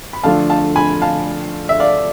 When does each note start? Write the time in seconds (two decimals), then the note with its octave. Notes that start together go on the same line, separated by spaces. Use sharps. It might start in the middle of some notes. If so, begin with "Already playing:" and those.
0.13 B5
0.23 D3 F3 A3 D4 F4 F5 A5
0.49 F5 A5
0.76 G#5 B5
1.02 F5 A5
1.69 E5
1.80 D5 F5